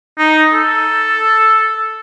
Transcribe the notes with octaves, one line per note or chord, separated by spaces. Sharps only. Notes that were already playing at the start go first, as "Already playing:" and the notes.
D#4
A4